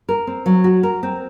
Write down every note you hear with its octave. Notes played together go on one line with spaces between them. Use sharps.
A#4
C4
F#3
F#4
A#4
C4